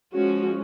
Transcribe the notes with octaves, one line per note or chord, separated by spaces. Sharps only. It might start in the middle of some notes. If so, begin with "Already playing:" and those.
F3 G#3 C#4 F#4